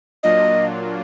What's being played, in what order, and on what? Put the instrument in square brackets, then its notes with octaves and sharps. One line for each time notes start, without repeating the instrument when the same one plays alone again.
[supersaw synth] A#2 F#3 A#3 D4 F4 [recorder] D#5